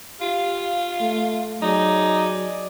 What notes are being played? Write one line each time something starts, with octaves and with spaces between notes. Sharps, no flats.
F4 G4 F5
A3
F#3 D#4 G#4 D5